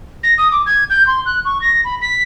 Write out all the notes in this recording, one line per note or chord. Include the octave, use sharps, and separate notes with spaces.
A#6
D#6
D6
G#6
G6
C6
F#6
C#6
A#6
B5
B6